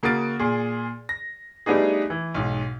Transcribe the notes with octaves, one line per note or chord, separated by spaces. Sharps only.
C#3 A#3 F#4 D#6 A6 D7
A#2 G#4
A#6
G3 A3 B3 D4 D#4 G#4
E3
B1 G#2